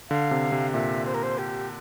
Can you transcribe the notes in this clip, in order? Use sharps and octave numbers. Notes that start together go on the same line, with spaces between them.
D3 F5
C3
C3
A#2 E5
C5
A#4
C5
G4